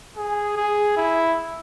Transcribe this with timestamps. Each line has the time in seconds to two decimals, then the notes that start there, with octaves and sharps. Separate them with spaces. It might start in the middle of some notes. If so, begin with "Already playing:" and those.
0.17 G#4
0.57 G#4
0.97 E4